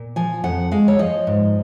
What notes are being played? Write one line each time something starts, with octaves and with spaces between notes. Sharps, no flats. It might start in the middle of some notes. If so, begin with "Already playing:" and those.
Already playing: A#2
F3 G#5
F2 F#5
G#3 F5
C#5
F3 D#5
G#2